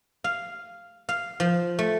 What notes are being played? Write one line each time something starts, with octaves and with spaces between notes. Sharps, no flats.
F5
F5
F3
A3